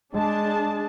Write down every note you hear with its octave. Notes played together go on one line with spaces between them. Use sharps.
G#3 D4 G#4 A5